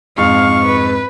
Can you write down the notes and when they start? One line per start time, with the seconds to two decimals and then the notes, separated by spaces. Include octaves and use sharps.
0.18 F2 G#2 F5 C#6
0.66 B4